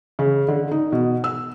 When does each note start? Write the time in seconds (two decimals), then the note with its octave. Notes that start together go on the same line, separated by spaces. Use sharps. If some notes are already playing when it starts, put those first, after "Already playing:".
0.19 C#3
0.48 D3
0.71 D#4
0.92 B2
1.24 E6